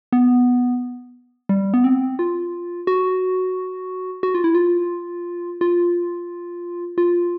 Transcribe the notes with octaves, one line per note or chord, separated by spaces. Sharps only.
B3
G3
B3
C4
F4
F#4
F#4
F4
E4
F4
F4
F4